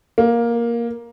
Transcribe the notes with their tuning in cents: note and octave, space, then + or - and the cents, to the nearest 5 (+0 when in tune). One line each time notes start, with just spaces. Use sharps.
A#3 +10